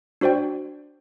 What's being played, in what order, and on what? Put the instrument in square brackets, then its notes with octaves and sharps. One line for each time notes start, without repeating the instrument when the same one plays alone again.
[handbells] D4 F#4 C5 D5 G5